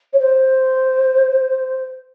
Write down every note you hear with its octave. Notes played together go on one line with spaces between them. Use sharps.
C#5
C5